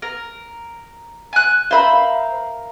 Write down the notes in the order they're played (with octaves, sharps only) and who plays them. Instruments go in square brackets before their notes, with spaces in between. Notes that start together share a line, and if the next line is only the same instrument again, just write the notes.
[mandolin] A#4
G#5 F#6
[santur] A#4 E5 F5 [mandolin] C5 B5
[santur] F5